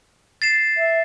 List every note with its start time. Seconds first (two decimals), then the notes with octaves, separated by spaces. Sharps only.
0.42 A6 C7 E7
0.77 E5